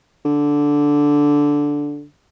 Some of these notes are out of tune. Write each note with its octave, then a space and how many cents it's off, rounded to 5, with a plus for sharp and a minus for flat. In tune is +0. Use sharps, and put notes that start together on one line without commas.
D3 -10